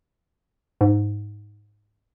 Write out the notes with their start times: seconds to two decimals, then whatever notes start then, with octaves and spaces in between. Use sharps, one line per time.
0.81 G#2